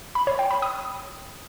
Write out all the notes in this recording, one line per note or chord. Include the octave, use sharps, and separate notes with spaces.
B5
C#5
G5
B5
D#6